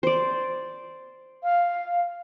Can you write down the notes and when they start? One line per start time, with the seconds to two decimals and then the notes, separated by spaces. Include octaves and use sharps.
0.03 C5 D5
1.43 F5